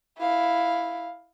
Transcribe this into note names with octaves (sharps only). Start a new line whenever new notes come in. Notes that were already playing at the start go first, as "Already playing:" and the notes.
E4 F5